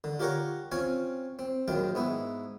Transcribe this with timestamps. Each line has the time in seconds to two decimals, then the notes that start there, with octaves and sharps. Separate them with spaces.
0.04 D3
0.20 F4 G4 A#4 C#5 F#5 A#5
0.72 C4 C#4 F4 C#5 G#5
1.39 C4
1.68 A#1 F#2 D#3 F4 G5
1.95 G#2 B3 E4